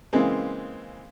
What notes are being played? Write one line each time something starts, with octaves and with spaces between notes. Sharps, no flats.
C#3 E3 G#3 A#3 C4